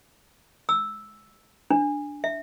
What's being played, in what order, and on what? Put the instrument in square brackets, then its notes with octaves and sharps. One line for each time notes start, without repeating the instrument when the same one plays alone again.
[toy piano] E6
D4
E5